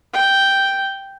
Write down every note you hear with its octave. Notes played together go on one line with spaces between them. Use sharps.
G5